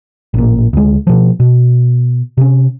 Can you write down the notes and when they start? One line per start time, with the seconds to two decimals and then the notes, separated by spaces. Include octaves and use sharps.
0.34 A1 A#2
0.73 D2 G#3
1.07 B2 F3
1.40 B2
2.38 C3 C#4